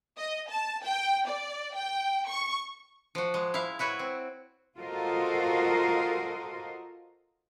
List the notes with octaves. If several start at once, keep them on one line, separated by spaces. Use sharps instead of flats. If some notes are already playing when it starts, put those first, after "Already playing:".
D#5
A5
G5
D5
G5
C#6
F3 F#4
G#3
E4 F5
E4 F#4 B4 C#5
C4
F4 F#4 A4 A#4 C5 D#5